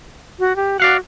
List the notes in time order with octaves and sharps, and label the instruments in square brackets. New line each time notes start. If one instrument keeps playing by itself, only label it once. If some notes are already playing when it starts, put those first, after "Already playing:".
[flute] F#4
G4
[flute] F#4 [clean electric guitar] D5 F5 F#5